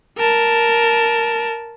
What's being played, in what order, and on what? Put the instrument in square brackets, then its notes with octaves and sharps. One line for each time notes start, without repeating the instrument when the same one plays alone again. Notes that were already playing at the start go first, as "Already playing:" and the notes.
[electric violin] A#4 A5